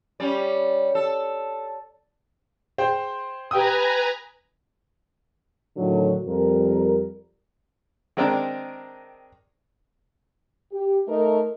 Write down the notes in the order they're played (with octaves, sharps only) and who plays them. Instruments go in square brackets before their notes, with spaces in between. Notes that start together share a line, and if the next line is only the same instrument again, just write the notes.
[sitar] G3 C#4 D5
A4
[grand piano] G#4 C5 G5
[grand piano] G4 G5 D#6 [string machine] B4 G#5 A#5
[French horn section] A2 D3 D#3 F#3
F2 G3 A#4
[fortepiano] D#3 G#3 C4 D4 A#4
[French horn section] G4
A3 D#4 A#4